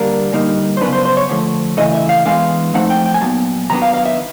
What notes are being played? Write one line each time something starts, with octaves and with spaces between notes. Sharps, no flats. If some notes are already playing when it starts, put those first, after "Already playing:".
Already playing: D3 G3 A#3 D4 A#4
D3 G3 A#3 D#4
C5
C#3 F#3 B3 D4 B4
C5
C5
C#5
D3 F3 A3
C#3 E3 A3 D#5
E5
F5
E3 G#3 B3 D4 F5
F3 A3 C4 D#4 F#5
G5
G5
G#5
A#2 F#3 B3 A5
D#3 F#3 B3 D4 A#5
F5
F5
E5